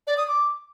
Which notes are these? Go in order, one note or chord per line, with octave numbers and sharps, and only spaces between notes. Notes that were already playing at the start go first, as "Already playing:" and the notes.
D5
D#6
D6